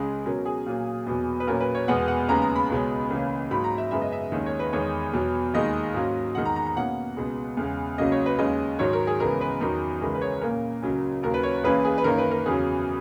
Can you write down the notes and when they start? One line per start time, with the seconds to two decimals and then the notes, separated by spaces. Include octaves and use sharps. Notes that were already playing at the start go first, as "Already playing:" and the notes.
Already playing: C#2 C#3 G#3
0.26 B2 F#3 C#4 A#4
0.46 G#4
0.66 A#2 F#3 A#3
1.06 E2 B2 F#3
1.40 B4
1.47 A#2 F#3 C#4 A#4
1.60 B4
1.75 C#5
1.88 E2 B2 G#3 B3 F#5
2.08 F#5
2.28 D#2 C#3 G#3 B3 A#5
2.42 A#5
2.56 B5
2.70 C#2 B2 G#3 C#4
3.10 C#2 C#3 E3 A#3 C#4
3.51 G#2 F#3 A#3 C#4 B5
3.64 A#5
3.78 E5
3.91 F#2 C#3 G#3 B3 E5
4.02 D#5
4.12 E5
4.32 D#2 D#3 G#3 C#4 D#5
4.46 C#5
4.60 B4
4.73 E2 D#3 G#3 C#5
5.13 E2 B2 F#3
5.54 D#2 D#3 G#3 D#5
5.94 G#2 F#3 A#3 C#4
6.35 E2 D#3 G#3 F#5
6.45 A#5
6.56 A#5
6.66 A#5
6.76 B2 A#3 C#4 F#5
7.17 C#2 B2 G#3
7.57 E2 C#3 G#3
7.98 C#2 C#3 F#3 A#3 C#4 D#5
8.12 C#5
8.26 B4
8.38 D#2 C#3 G#3 C#4 D#5
8.79 G#2 D#3 F#3 C#5
8.93 A#4
9.07 G#4
9.20 C#2 C#3 E3 G#3 B3 A#4
9.41 B4
9.61 E2 D#3 F#3 A#4
10.01 C#2 C#3 E3 G#3 C#4 A#4
10.14 B4
10.22 C#5
10.42 A#2 A#3 C#4 A#4
10.83 C#2 C#3 F#3 C#4
11.23 D#2 C#3 F#3 A#4
11.34 B4
11.43 C#5
11.64 C#2 C#3 E3 A#3 C#4 B4
11.85 G#4
11.98 B4
12.04 F#2 D#3 A#3 C#4 A#4
12.18 B4
12.31 A#4
12.46 E2 C#3 F#3 G#4